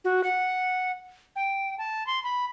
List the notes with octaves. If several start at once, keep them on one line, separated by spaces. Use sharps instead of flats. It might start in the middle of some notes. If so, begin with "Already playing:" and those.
F#4
F#5
G5
A5
C6
B5